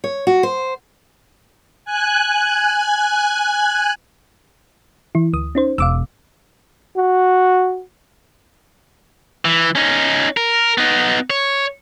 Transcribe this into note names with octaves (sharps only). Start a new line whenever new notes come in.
C#5
F#4
C5
G#5 F#6
E3 E4
D2 D#6
C#4 D#4 C5
E1 F5 D6 E6
F#4
E3
C#4 D#4
A#4
B3 D#4
C#5